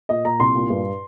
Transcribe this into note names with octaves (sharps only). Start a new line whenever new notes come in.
A#2 D#5
A#2 A#5
C2 C6
A#2
G2